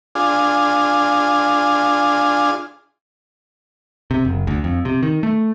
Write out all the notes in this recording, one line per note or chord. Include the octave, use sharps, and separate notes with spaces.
D4 F4 G#4
C3
F#1
D2
F2
C3
D#3
A3